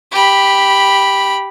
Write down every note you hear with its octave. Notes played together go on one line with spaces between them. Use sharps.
G4 B5